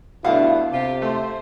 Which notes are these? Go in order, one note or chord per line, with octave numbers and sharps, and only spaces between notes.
G2 B2 D3 A3 E4 F5 F#5
C3 F4 G4
A3 C5 C6